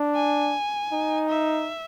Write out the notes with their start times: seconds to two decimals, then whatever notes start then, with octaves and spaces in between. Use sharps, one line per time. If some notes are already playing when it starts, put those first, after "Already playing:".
Already playing: D4
0.15 G#5
0.92 D#4
1.30 E5